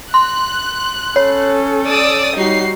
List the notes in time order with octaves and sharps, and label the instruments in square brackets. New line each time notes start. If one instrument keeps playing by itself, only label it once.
[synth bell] C6 [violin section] F#6
[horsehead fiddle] C#4 A4 [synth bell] C#5
[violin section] D5 D#6 E6
[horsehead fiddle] G3 F#4 [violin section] D#4 C7